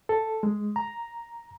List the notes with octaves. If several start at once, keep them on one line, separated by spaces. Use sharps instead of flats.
A4
G#3
A#5